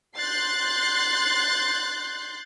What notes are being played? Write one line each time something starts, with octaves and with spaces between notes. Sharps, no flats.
C6 F#6 G6 A6 C7